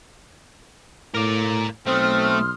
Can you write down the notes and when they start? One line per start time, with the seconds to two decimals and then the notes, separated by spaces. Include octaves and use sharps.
1.14 A2 A#4 D5
1.86 B1 A3 C4 C6 D#6 F6